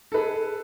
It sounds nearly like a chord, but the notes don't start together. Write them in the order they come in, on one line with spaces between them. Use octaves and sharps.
A4 B4 G#4